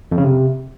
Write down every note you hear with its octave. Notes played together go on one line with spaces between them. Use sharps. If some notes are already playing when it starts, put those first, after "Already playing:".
F2
C#3
C3